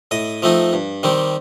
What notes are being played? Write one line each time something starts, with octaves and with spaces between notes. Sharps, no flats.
A2 D#5
F3 A3 C4 D#4
G2
D#3 G3 C4